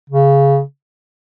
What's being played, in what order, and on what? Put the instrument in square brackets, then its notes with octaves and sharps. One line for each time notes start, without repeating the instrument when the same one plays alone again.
[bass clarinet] C#3